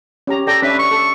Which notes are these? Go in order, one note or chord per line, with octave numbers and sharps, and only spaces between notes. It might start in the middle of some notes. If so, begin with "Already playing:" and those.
C#4 G4 A#5
A4 D5 G5 A#5
C#4 D4 B4 E5
C#6
A4